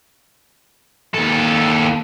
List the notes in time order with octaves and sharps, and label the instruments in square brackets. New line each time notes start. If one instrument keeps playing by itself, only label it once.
[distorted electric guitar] D#2 A4